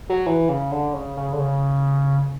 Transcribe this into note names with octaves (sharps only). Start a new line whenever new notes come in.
F#3
E3
C#3
D3
C#3
C#3
D3
C#3